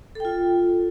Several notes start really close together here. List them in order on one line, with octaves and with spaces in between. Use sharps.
A4 G5 F4